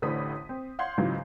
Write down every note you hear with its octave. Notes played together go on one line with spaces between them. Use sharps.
A1 A2 D3 C5 D#6 B6
C4
F5 F#5 C6 G6 G#6 C7
G#2 C#3 E3 F#3 F4